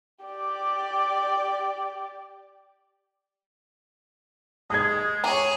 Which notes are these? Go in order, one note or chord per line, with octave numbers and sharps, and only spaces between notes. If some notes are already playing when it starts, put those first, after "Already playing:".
G4 D5
G#3 D#6 G#6
E3 G#4 C#5 A#5